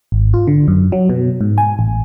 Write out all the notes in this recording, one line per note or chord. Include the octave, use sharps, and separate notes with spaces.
G#1
F4
D3
F#2
F#3
B2
G#2
G#5
A1